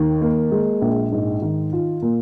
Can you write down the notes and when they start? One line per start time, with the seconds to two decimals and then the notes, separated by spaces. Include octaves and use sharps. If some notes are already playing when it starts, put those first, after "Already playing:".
Already playing: D#2 D#3
0.21 A#3
0.52 G#3
0.82 A#1
1.12 G#2
1.42 D#3
1.73 F4
2.02 A#2